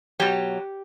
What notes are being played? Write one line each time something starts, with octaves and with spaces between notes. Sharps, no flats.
B2 F#3 G4